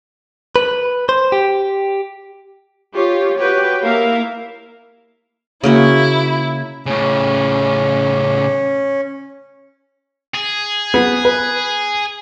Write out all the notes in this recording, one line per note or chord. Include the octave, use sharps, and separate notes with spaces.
B4
C5
G4
F4 G4 C#5
F#4 G4 B4 C#5 G5
A#3 E4 A#4 E5 F5
C#3 A#3 E4 F#4
A2 C#3 C#4
G#4
B3
B4